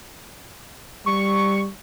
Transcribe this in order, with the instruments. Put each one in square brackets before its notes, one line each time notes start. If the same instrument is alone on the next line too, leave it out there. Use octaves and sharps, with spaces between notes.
[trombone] G3 [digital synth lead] C#6